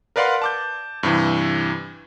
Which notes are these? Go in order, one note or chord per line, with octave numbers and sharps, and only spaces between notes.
A#4 B4 D5 F5 F#5 C6
A5 D6 G6
G2 C3 E3